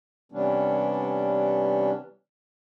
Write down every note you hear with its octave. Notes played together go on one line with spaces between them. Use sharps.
C3 E3 G3 B3 C#4 D4